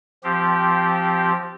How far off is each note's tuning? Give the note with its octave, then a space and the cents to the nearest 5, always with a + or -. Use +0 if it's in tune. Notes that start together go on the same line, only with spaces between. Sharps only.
F3 +0 C4 +0 G4 -15